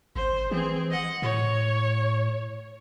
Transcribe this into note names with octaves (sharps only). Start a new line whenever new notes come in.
G#1 C5
E3 C4 G#4
D#5 F#5
A2 C#5